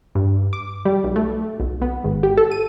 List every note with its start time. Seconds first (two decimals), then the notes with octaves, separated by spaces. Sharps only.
0.15 G2
0.53 D6
0.85 G3
1.04 B1
1.16 A3
1.60 B1
1.82 B3
2.04 G#1
2.23 G4
2.37 A4
2.51 D#7